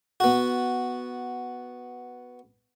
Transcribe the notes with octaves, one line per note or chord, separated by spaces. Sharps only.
B3 F#4